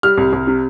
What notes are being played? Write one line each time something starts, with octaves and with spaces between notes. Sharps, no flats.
G3 F6
C2
C2
C3